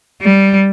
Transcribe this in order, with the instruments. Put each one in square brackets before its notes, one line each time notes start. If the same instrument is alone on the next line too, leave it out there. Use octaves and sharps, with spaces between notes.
[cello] G3